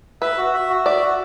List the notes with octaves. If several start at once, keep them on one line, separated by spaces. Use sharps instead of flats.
B4 E5
F#4
E5
F#4
D5 E5
F#4